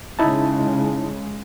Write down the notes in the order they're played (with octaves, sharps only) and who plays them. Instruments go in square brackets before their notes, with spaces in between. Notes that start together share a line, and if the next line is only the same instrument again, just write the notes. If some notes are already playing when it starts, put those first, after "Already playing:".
[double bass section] C#3 G#3 [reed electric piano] D#4 E4 A5